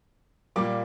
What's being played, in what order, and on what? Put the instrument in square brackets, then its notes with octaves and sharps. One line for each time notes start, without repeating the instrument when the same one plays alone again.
[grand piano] A#2 G3 A#3 D6